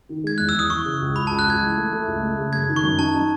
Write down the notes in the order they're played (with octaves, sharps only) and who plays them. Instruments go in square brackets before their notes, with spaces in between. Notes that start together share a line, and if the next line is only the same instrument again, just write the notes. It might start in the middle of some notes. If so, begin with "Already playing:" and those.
[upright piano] D#3
[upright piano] G#3 [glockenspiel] G#6
[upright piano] E2 [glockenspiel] F#6
[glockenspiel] E6
[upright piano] E2
[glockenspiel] D#6
[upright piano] E3 [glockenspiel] C#6
[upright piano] C#3
C#2
[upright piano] C#2 [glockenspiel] B5
[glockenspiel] A5
[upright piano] C#2
[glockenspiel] F#6
[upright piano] C#2 [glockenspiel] G#6
[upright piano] E3
A3
A3
C#2
A3
C#3
[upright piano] F#2 [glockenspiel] G#6
[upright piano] D#3
[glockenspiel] C#6
[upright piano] F#2
[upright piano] D#4 [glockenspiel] A5
[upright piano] D#4